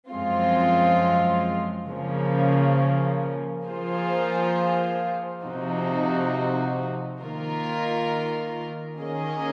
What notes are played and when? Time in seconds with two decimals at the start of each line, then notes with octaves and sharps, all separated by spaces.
0.10 F#2 F3 G#3 C4 F4
1.88 C#3 F3 A#3 C#4
3.66 F3 A#3 F4 G#4 C5
5.43 C3 F3 C4 D#4 F#4
7.21 D#3 A#3 F4 A#4
8.99 D#3 A#3 C#4 G#4 D#5